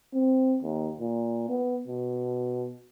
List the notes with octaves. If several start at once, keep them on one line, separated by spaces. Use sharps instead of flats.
C4
D#2
A#2
B3
B2